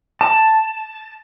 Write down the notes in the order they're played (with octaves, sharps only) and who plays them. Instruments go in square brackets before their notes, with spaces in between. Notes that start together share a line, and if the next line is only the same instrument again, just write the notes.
[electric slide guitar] A5